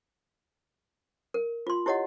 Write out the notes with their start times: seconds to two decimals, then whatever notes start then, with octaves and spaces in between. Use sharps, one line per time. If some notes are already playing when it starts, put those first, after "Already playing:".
1.34 A#4
1.67 F4 C6
1.86 E4 G4 C#5 D#5 F#5